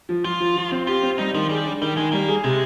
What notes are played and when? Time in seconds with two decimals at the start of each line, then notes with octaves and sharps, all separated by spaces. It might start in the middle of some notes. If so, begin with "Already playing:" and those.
0.09 F3
0.25 F3 F4
0.40 F3
0.56 F3
0.72 C4
0.87 F4 G4
1.03 C4
1.18 G3 D#4
1.34 D#3 F3
1.49 G3 G#4
1.65 D4
1.81 D#3 G3
1.97 D#3 G#3
2.12 G3 A#3
2.28 G#4
2.44 C3 G#3